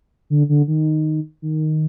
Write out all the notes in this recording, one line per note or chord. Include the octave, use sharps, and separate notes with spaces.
D3
D3
D#3
D#3